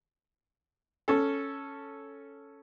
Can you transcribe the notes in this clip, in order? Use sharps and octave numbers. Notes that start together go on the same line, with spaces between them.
C#4 A4